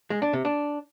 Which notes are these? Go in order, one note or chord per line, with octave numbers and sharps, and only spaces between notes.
G#3
D4
C3
D4